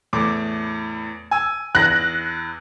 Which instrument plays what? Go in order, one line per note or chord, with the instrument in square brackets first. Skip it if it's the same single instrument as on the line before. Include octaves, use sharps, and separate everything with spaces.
[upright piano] E2 A2 D6
G#5 E6
[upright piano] E2 [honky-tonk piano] F#6 A#6